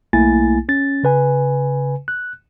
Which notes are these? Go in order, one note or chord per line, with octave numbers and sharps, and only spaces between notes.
B1 A3 A#3 E4 G#5 A6
C#4 A6
C#3 B4 G#5
F#6